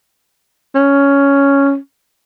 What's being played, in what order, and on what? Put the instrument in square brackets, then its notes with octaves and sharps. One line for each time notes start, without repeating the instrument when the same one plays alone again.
[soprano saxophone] C#4